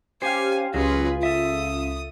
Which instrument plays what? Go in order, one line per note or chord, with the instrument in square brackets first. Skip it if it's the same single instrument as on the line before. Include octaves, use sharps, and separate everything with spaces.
[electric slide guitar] C#4 C5 [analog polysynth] G4 F5 [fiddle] G#5
[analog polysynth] C#2 F4 [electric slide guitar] F#3 C#4 [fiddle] G#4 B4
[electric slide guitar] A4 E5 [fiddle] D#6